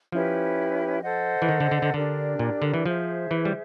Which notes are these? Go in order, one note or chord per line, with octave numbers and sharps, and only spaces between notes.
F3 C#4 E4 G4 B4
A4 C5 D#5 F#5
E3
D#3
D3
D3
D3
D3 D4 G4 A#4 D5
A#2
D3
E3
F3 G#4 C5 E5
E3
G3